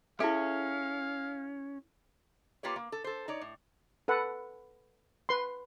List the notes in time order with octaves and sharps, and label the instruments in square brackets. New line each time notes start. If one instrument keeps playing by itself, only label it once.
[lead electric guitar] C#4 [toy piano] E4 A4 [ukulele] G#4 E5 [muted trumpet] F5
[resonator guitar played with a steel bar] A#3 F4 G4 B4 C#5
A#3
A4
A4 C5
D#4 C#5 D5
A2
[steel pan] A4 B4 F#5
B4 C6